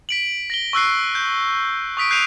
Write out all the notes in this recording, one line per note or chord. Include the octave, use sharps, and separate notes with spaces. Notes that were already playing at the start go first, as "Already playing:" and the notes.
B6 D7 F#7
A#6 F#7 G7
C#6 E6 F#6 C7
G6
C#6 D#6 B6 D7
F#6 G6 C7 D7 D#7 F7